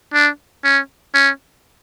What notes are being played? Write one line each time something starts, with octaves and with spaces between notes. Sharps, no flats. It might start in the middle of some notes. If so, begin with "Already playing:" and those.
D4
C#4
C#4